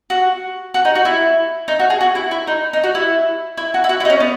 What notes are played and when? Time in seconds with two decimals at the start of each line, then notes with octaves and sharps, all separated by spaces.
0.10 F#4
0.74 F#4
0.85 D#4
0.95 F#4
1.05 E4
1.68 D#4
1.80 F#4
1.90 G#4
2.01 F#4
2.15 E4
2.31 E4
2.47 D#4
2.73 D#4
2.84 F#4
2.95 E4
3.57 E4
3.74 F#4
3.84 E4
3.89 F#4
4.00 E4
4.05 D#4
4.10 C#4
4.20 B3